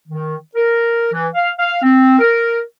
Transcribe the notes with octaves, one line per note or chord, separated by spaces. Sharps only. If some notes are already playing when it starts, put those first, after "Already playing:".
D#3
A#4
E3
F5
F5
C4
A#4